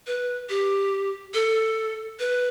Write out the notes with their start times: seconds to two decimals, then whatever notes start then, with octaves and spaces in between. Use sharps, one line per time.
0.07 B4
0.49 G4
1.34 A4
2.20 B4